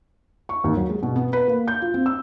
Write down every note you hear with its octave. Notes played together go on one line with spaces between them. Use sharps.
C#6
D#2
F#3
G#3
B2
B3
B4
A#3
G6
F4
C4
E6